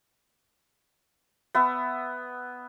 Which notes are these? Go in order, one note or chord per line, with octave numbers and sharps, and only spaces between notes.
B3 E5